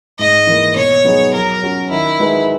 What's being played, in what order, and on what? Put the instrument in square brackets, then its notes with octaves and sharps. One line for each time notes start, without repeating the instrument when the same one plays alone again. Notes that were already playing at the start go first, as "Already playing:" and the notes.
[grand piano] G#2 [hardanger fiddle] D#5
[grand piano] E3 A#3
[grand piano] B2 [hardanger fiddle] C#5
[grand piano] F#3 B3 D#4 G#4
[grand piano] F#3 [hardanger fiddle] A#4
[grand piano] C#4 F#4
[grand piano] D#3 [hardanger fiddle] E4
[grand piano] G#3 D#4 F#4 B4